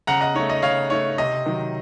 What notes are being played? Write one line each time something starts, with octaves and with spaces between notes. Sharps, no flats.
C#3 F#5 A#5
D#5 F#5
A3 D#4 C#5
D#5
C#3 C#5 F5
A3 D#4 C#5
C3 D#5
D#3 F#3